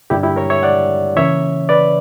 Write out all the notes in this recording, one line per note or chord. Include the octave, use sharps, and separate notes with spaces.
G2 D3 G3 A#3 D4 E4 G4
E4 G4
A#4 C#5
C#5 E5
D5 F#5
C#3 E3 A#3 C#4 C#5 E5
B4 D5